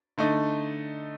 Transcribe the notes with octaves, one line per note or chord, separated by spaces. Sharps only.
D3 A3 D#4